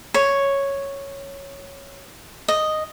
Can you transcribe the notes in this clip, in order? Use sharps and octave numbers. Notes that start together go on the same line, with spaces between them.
C#5
D#5